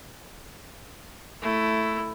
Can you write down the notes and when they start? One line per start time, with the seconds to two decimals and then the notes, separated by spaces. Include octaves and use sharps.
1.42 A3 E4